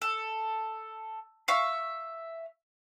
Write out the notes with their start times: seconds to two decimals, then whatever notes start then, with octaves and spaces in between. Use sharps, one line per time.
0.02 A4
1.48 E5 F5 C#6